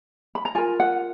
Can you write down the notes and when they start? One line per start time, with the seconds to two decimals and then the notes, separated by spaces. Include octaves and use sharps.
0.35 B5
0.45 A#5
0.55 F4 A#4 G#5
0.80 F#5